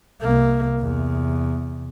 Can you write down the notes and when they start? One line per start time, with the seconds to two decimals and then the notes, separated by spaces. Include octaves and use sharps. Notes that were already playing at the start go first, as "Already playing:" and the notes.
0.21 C2 A#3
0.81 E2 C3